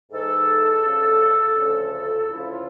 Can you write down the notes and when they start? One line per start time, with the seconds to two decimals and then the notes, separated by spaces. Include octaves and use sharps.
0.11 G#2 E3 A4
0.85 D2 C#3 F3
1.57 D2 C#3 F3 A4
2.30 D2 C#3 F3 E4
2.48 F4